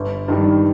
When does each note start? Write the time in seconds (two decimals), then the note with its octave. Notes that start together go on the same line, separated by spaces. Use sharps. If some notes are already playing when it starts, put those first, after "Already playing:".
Already playing: G1
0.28 G2 D#3 G3